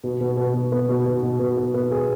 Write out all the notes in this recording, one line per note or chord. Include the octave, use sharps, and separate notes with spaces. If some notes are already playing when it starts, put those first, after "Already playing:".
B2
B2
B2
B2
B3
B2
B2
B2
B2
B3
B3
G#4